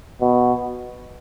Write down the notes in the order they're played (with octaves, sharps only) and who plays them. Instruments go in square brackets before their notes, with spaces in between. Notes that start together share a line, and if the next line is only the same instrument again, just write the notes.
[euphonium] B2